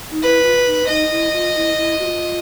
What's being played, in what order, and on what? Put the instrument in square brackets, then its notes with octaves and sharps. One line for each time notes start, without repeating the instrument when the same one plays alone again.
[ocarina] D#4
[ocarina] E4 [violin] B4
[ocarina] F4
D#4
[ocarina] D#4 [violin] D#5
[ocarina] E4
F4
E4
E4
F#4
F4